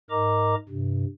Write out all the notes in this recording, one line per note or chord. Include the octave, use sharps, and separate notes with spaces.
G#2 A#4 D#5 A#5 D6
G2 C3